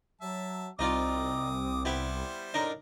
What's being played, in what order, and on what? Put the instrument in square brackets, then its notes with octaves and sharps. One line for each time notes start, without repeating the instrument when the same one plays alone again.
[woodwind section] F#3 [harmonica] E5 A5
[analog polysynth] C2 [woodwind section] C4 [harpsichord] D#4 F4 D5 [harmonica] D6 D#6
[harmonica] G3 C5 [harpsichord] B3 E4 G4
[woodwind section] F#2 A2 A4 [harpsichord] D4 D#4 A#4